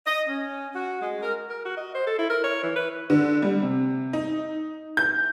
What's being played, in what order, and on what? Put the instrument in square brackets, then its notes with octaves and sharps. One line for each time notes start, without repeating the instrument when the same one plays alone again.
[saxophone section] D#5
C#4
F#4
G#3
A#4
[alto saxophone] A#4
F#4
D#5
C5
A4
E4
A#4
C#5
E3
B4
[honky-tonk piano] D3
G3
C3
D#4
G6